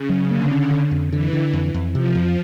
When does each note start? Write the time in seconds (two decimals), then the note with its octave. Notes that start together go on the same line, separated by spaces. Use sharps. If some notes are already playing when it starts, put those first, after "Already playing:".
Already playing: C#3
0.09 F#3
0.31 D3 A#3
0.51 C#4
0.71 D3
0.91 F2
1.12 D3 E3
1.33 D3
1.53 F2
1.74 F2
1.94 C3 F3
2.15 F2